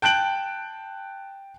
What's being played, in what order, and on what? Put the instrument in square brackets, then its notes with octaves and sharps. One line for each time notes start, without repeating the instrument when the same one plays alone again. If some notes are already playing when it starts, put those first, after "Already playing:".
[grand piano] G5 A5 F#6 G6 D7 F#7